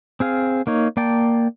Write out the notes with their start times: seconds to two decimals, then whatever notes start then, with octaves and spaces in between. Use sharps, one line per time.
0.20 C4 G#4 F5
0.67 A#3 D#4 C#5
0.97 A#3 D5 G5 A5